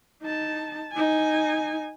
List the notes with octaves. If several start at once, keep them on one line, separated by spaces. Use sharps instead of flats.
D#4 A5
D#4 G#5